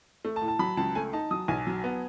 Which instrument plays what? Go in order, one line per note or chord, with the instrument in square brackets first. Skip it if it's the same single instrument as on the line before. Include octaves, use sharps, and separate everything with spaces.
[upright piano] A3
[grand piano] A5
[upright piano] A2
[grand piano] A5
[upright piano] F#3 [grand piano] B5
[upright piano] C#2 [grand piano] A5
[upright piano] A3 [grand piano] G#5
[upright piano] D#4 [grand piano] A5
[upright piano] F#3 [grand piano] D#6
[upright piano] B1 [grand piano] G#5
[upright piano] F#3
B3